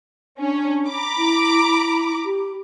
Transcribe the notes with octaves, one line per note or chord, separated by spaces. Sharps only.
C#4 D4
A#5 B5 D6
E4
G4